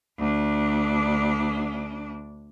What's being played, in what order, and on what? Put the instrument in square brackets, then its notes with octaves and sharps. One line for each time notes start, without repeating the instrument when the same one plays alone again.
[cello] D2 D4